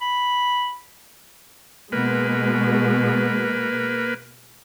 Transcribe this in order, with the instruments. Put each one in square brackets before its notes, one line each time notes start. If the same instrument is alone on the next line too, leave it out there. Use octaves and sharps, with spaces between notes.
[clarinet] B5
[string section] B2 G#3 [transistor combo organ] A#3 B4